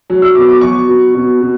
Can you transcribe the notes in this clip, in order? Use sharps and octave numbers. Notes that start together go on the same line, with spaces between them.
F#3
E6
B2 D6
D6
F#3 C#6
B2
B2
B2